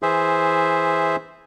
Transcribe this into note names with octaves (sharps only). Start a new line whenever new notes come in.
E3 G#4 C5 E5